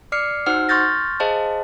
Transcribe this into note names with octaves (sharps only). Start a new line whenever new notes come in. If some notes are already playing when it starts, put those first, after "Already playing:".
D5 D6 F6 C7 C#7
D#4 F#4 C5 F#5 E6 F6
C6 C#6 F6 G6 A6 A#6
G#4 C5 D#5 F5 A5